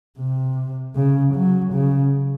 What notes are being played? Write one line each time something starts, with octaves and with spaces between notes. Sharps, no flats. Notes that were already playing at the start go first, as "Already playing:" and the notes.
C3
C#3
F#3
C#3